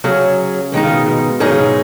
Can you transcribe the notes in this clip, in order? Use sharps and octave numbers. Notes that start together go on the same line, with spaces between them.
C#3 F#3 C#4 G#4
G#2 D#3 G#3 D#4
C#3
B2
B2
G#2 D#3 F#3 D#4 G#4
C#3
B2